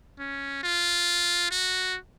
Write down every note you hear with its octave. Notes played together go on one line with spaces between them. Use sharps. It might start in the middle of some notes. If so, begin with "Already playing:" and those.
C#4
F4
F#4